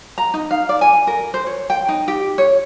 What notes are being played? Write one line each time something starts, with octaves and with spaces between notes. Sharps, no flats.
A#5
D#4
F5
D5
G#5
A#4
C5
C#5
G5
D#4
G4
C#5